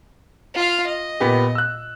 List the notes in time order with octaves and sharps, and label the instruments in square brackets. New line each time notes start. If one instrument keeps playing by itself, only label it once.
[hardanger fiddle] F4 F5
D#5
[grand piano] A#2 B3 G4
E6 F#6